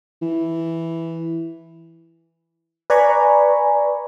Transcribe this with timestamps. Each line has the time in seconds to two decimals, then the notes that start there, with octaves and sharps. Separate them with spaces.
0.22 E3
2.90 B4 D5 G#5 A#5 B5 C#6